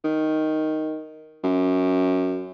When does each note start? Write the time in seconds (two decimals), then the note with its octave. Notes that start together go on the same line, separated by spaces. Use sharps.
0.04 D#3
1.44 F#2